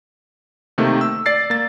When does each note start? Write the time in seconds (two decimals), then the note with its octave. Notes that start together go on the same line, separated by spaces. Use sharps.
0.78 C3 D#3 A3 A#3
1.01 E6
1.26 D5 A6 C7
1.50 A#3 A6